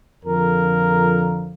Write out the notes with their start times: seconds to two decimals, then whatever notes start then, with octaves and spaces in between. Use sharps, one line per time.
0.24 F2 D3 F3 A#4